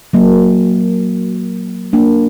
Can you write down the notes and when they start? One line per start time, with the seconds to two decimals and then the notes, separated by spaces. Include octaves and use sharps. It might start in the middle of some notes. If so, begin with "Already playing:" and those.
0.13 F#3 A#3
1.93 A#3 D4